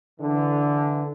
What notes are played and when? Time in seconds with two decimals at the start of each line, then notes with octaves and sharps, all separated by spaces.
0.20 D3 E3